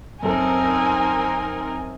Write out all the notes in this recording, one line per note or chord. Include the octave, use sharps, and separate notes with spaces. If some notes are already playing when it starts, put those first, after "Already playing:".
F#2 C4 D#4 A4 A#4 G#5